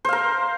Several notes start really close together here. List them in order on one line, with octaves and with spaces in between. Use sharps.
C5 F5 A#4